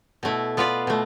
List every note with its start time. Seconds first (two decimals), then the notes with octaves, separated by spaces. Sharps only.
0.23 B2 A3 E4
0.57 B3 F4 B4 D5
0.87 B2 A3